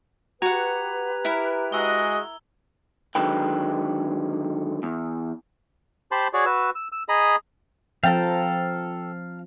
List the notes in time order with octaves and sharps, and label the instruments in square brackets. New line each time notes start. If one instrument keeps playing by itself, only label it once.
[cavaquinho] F#4 F#5 [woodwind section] G4 B4 [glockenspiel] A#5 G#6 F7
[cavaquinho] E4 A#4
[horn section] G#3 F#4 D#5 [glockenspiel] E6 G7
[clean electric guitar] D3 D#3 F#3 G#3 B4 G5
E2
[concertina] G4 C5 A5 B5 C6
F#4 G#4 C#5 D5
F#4 B4 E6
E6
E6
G#4 D#5 A#5 B5 D#6
[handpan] F3 C4 [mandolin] A4 G5 [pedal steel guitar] F5 A5 A#5